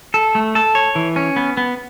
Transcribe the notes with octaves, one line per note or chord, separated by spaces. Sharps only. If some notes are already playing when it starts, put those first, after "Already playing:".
A4
A3
A4
C#5
E3
C#4
B3
B3